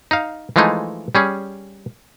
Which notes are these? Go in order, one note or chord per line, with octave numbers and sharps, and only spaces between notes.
D#4 F5
E3 F3 G#3 A3 D#4
G3 C#4 G#4